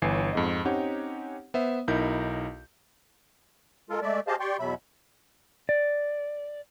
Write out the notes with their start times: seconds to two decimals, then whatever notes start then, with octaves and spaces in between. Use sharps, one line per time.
0.02 G1 E3 C#5 G#5 C7
0.33 F2 G#2 D#5
0.65 C4 C#4 D#4 G4 C#5 F#5
1.54 B3 C5 E5
1.88 B1 D#4 E4 A#4 G6
3.90 G#3 F4 A4 A#4
4.02 G#3 A3 D5 E5
4.27 G4 G#4 C5 D#5 F5 A5
4.40 G4 D5 G5 C6 C#6
4.59 E2 B2 F#3 E5 B5
5.69 D5